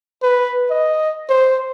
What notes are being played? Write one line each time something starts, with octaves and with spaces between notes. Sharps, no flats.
B4
D#5
C5